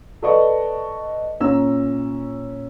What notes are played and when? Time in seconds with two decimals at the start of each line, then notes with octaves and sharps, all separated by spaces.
0.22 A4 B4 D5 D#5 C#6
1.40 A#2 C#4 A#5 E6